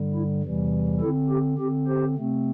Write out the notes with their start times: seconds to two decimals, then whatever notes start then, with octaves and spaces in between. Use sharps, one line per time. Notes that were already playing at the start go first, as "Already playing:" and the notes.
Already playing: G2 D3 G3
0.14 E4
0.42 E2 C3 E3 G3
1.00 D3 C4 E4 A4
1.30 G4
1.58 D3 C4 G4
1.87 G4 C5
2.16 C3 A3 C4